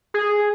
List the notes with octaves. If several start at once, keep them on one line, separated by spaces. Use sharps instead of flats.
G#4